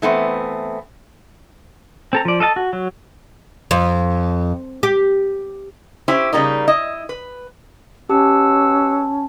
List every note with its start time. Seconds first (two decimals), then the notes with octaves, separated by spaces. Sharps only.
0.02 E3 A3 B3 C4
2.13 C4 A4 A#5
2.25 F3 D5
2.40 A4 D#5 F5 A5
2.56 F#4
2.73 F#3
3.71 F2
4.83 G4
6.08 C#4 E4 G4 C5
6.33 C#3 G3 A#3 D#4
6.68 E4 D#5
7.09 B4
8.09 B2 C#4 G4 F#5 A5 E6